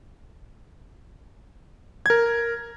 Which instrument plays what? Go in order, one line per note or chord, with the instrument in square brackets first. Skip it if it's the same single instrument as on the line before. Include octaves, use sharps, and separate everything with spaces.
[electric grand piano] A#4 G#6